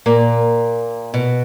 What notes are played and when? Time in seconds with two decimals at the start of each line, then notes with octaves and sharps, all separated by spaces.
0.06 A#2 A#3
1.14 B2